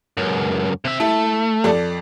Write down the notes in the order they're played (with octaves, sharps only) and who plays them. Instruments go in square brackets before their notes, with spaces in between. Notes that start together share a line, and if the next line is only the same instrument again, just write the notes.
[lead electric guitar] C#2 F#2
C3 E5
[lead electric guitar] A3 [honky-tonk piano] E4
[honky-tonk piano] F2 A4 D5